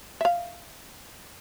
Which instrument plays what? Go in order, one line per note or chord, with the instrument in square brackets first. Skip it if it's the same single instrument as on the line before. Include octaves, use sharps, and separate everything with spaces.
[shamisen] E5 F5